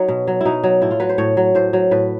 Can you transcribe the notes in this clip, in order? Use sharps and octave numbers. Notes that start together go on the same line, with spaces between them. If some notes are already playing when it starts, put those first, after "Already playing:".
Already playing: F#3 D#4
B2
F#3
B2 D#4 E4
F#3
A2 E4
F4
F#3 B4
C5
A2 C#5
F#3
A2 C5
F#3
A2 B4